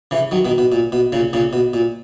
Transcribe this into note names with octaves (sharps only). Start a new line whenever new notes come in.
C#3 E3
D#3 F#3
B2 D#3
B2
A#2
B2
A#2 C#3
A#2 C#3
B2
A#2